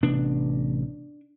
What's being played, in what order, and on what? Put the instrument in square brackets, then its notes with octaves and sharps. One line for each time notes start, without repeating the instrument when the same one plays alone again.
[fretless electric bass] A1 C3 B3 [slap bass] D4